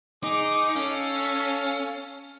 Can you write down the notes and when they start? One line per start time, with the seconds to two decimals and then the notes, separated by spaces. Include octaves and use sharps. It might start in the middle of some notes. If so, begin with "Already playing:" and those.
0.24 D#4 G#4 D6
0.76 C#4 A4 F5